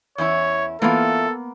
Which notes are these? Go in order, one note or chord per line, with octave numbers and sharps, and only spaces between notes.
E2 C#4 E4 C#5
E3 A#3 B3 F4 A4